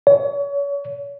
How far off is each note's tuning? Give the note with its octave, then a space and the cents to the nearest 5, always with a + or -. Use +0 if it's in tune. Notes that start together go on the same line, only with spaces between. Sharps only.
C#5 +35